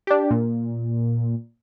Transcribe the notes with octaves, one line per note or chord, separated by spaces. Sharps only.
D4 G4
A#2